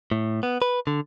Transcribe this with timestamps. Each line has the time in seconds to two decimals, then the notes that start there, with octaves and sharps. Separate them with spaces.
0.11 A2
0.43 B3
0.62 B4
0.87 D3